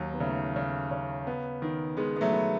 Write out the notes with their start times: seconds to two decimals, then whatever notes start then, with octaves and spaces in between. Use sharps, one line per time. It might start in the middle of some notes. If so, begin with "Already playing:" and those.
Already playing: D#2 D#3 F#3
0.12 B3
0.20 C#3 F#3 A3
0.56 C#3
0.91 C#3
1.27 B3
1.62 D#3
1.97 D#3 G#3 B3
2.16 B3
2.21 F#3 A3
2.33 B3